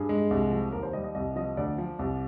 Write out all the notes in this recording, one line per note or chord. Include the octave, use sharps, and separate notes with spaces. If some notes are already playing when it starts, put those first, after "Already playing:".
Already playing: G2 G#4
G#3
C2
F3
D#2 A#4
C5
G3 D#5
D#5
C2 D#5
F3 D#5
D2 D5
F3
C2